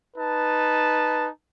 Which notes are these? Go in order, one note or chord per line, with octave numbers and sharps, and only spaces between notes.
D#4 B4 A5